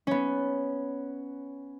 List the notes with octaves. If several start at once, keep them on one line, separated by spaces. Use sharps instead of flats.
B3 C#4